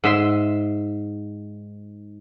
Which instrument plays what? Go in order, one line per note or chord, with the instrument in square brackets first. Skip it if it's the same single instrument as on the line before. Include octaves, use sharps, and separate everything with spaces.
[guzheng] G#2 E5 C6